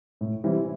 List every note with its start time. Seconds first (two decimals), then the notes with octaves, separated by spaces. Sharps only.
0.21 A2
0.44 E3 G3 C4 E4